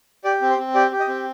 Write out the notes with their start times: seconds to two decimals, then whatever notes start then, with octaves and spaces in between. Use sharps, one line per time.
0.24 G4 D5
0.41 C4
0.50 C5
0.58 C4
0.74 G4 D5
0.91 G4
1.00 D#5
1.08 C4